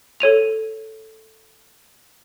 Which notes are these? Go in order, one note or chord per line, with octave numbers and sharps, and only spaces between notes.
A4 C#5 D#7 F7